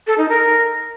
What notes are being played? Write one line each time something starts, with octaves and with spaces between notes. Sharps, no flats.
A4
D#4
A#4